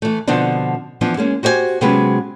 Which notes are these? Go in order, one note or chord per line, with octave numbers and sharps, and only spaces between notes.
E3 A3
B2 D3 F3 B3 C4 D4
E3 F3 B3 D4
G#3 A#3 C#4
F#4 G4 C5 D#5 G#5
C3 F#3 G#3 B3 C#4 B4